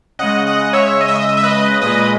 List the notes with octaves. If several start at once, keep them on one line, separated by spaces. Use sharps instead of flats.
C#3 G#3 D#5 F#5
D#5 F#5
C#5 E5
D#5
E5
D#5
E5
D#5
E5
B4 D#5
A#2 G#3 B4 D#5